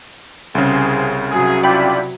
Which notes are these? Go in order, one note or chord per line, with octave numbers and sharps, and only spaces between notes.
C2 C#3 C4 G#4
C3 F#3 G#4
D4 E4 F4 D5 G5 B5